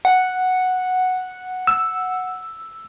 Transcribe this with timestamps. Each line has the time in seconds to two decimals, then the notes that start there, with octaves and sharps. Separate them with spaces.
0.05 F#5
1.67 E6